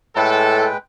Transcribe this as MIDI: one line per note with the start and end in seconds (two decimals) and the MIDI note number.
0.16 0.68 45
0.16 0.77 56
0.16 0.67 69
0.16 0.77 71
0.16 0.77 79